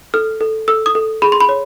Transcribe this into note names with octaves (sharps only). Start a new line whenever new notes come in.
A4 F6
A4
A4 E6
D#6
A4
G#4 B5
C6
B5
C#5